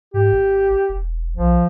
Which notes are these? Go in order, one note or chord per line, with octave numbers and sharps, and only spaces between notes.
G#2 G4
G#1
E1
B1 F3